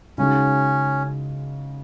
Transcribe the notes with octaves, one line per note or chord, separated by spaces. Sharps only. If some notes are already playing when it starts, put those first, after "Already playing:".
C#3 G#3 C#4 D#4 F#4